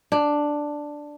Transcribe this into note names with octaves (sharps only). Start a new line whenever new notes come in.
D4